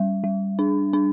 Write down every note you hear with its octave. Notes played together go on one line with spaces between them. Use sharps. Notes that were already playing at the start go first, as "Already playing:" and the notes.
Already playing: G3
G3
D4
D4